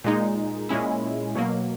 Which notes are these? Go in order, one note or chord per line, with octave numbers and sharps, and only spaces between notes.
A#2 G#3 D#4
A#2 G#3 C#4 E4
B2 F#3 A#3